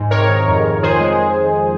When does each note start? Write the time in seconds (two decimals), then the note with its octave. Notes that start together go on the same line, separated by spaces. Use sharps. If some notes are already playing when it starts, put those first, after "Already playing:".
Already playing: G#2
0.10 C3 A#4 C#5
0.29 D#3
0.47 F2
0.65 F2
0.82 D#3 G#4 C5
1.00 G#3